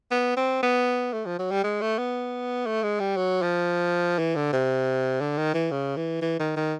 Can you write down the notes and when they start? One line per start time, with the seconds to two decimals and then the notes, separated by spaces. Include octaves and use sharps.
0.11 B3
0.37 C4
0.63 B3
1.13 A3
1.26 F3
1.38 F#3
1.51 G3
1.64 G#3
1.81 A3
1.98 B3
2.66 A3
2.83 G#3
3.00 G3
3.16 F#3
3.42 F3
4.18 E3
4.36 D3
4.52 C3
5.21 D3
5.37 D#3
5.54 E3
5.71 C#3
5.97 E3
6.22 E3
6.39 D#3
6.56 D#3